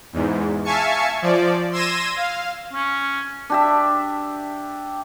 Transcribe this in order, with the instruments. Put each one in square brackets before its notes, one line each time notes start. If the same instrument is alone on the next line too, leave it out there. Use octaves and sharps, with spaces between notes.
[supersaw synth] E2 G#2
E5 F5 G#5 A5 C#6 C#7
F3 D5
C6 E6 G#6 A#6 D#7 E7
F5
[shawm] C#4
[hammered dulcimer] D4 G4 E5